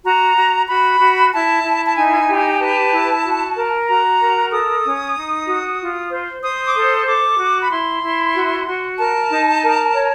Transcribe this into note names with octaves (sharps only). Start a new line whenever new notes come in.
F#4 A#5
F#4
F#4 B5
F#4
E4 A5
E4
A5
D#4 G#5
G4
G#5
B4 A5
E4
F#4
A#4
F#4 A#5
A#4
A4 D#6
C#4
D#4
F#4
F4
C5
C5 D#6
D6
A4 D#6
A4 D6
F#4
B5
E4 C6
E4
F#4
F#4
A#4 A5
D#4
A#4
C#5